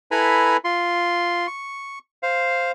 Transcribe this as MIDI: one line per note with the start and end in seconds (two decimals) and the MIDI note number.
0.11 0.57 64
0.11 0.57 69
0.11 0.57 71
0.11 0.57 80
0.11 0.57 82
0.11 0.57 83
0.64 1.47 65
0.64 1.47 84
1.47 1.99 85
2.23 2.72 72
2.23 2.72 77